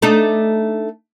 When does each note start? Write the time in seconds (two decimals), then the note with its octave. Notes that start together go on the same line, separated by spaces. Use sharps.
0.02 A3 D4 D#4